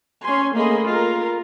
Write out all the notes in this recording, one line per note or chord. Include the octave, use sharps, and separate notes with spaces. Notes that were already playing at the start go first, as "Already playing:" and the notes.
C#4 G#5 C6
A3 A#3 G#4 D#5 B5 C6
F4 A#4